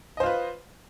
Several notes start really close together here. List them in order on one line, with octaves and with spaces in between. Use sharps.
D#5 C5 F4 B4